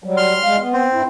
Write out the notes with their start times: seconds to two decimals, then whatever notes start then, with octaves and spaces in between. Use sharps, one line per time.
0.04 F#3 G3
0.17 C6 F6
0.43 G3 G#3 F5
0.58 B3
0.73 C4
0.93 G2 E4